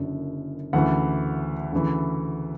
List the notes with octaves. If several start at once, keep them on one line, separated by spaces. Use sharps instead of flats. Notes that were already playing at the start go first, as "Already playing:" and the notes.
Already playing: F#1 F#2 D3
D2 C#3 E3 F#5
D2 C#3 E3